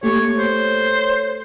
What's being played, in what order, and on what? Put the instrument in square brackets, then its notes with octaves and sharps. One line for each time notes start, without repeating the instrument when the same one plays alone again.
[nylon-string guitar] A3 G4 [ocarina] A#3 [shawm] C#5
[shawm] C5 [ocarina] C#5